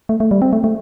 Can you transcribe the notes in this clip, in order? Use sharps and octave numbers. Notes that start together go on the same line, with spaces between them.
A3
A3
G3
C4
A3
A3